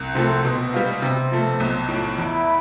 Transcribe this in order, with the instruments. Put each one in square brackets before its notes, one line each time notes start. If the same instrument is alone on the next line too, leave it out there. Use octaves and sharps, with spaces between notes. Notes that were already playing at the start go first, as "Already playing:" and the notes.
Already playing: [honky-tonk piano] C2
[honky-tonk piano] C3 F3 A3 [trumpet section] C4
[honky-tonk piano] B2 [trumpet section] C4
[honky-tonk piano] G3 B3 F4
[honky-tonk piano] C3 [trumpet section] C4
[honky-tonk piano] F3 A3
B1
A2 F3
[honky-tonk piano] E2 [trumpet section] E4